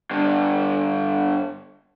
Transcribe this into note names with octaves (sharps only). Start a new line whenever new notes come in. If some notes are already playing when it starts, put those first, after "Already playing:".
G2 D3